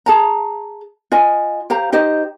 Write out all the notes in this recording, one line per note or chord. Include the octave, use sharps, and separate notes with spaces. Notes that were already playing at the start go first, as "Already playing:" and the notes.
G#4 A5 A#5
F4 D#5 G#5
G4 C5 F5 A#5
D#4 G4 C5 D#5